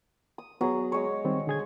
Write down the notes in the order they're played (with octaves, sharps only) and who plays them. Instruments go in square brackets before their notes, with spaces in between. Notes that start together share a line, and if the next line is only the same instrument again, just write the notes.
[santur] D#6
[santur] F#3 [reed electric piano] B3 G#4
[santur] G#3 C#5
[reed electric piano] D#3 G3 C4
D3 G#4 G#6